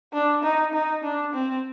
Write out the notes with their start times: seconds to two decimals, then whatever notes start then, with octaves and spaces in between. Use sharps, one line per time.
0.13 D4
0.43 D#4
0.73 D#4
1.03 D4
1.34 C4